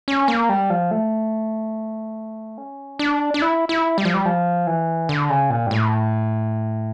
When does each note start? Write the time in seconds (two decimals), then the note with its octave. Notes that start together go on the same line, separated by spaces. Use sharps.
0.08 C#4
0.28 A#3
0.49 G3
0.70 F3
0.91 A3
2.58 C#4
2.99 D4
3.34 D4
3.42 E4
3.69 E4
3.98 G3
4.05 F3
4.14 G3
4.25 F3
4.67 E3
5.09 D3
5.30 C#3
5.50 A#2
5.67 G2
5.71 A2